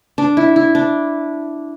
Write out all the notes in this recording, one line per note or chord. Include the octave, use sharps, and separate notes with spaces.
D4
E4
E4
D4